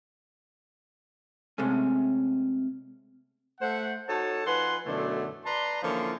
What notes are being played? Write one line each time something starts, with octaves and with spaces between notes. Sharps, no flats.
C3 G#3 A3 C#4
A3 C5 F#5
D#4 F#4 A4 C#5 A5
F3 D#4 B4 F#5 G#5 C6
F#2 B2 D3 E3 A3
B4 D5 A5 A#5 C6
D3 E3 F3 A#3 C#4 F4